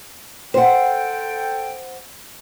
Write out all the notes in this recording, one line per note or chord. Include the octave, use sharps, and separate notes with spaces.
A4 C5 F#5 G5